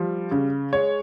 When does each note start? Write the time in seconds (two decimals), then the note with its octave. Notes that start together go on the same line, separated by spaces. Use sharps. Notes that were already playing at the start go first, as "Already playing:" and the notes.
Already playing: F3 G3
0.31 C#3
0.73 G#3 C#5